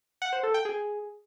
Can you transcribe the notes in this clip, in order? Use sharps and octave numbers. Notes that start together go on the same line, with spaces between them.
F#5
C5
A4
G5
G#4